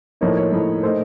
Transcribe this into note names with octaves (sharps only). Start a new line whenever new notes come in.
A2 F3 A#3 D#4 C#5
C#5
A2 F3 A#3 D#4
A#2 A3 D#4 C5